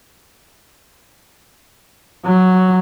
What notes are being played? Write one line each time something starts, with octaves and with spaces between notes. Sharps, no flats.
F#3